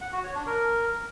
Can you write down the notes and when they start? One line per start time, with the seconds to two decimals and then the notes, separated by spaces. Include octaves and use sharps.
0.01 F#5
0.13 F#4
0.24 C#5
0.35 D4
0.46 A#4